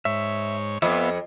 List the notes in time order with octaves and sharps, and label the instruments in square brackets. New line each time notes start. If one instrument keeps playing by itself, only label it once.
[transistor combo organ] G#2 C#5 [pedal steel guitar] E5
[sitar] F2 [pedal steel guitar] B3 E5 [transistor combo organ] F4